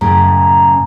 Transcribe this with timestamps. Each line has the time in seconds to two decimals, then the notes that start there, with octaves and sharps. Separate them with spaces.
0.01 F#2 A2 C#3 A#5